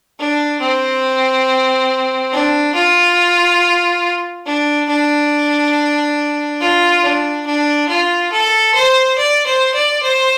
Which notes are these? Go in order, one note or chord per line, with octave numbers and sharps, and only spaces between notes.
D4
C4
D4
F4
D4
D4
F4
D4
D4
F4
A4
C5
D5
C5
D5
C5